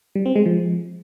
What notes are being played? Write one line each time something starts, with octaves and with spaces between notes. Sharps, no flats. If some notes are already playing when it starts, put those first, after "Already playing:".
G3
C4
G#3
F3